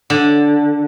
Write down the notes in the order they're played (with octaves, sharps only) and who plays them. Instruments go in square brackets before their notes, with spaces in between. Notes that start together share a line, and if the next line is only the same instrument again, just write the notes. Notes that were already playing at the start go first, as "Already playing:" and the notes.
[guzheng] D3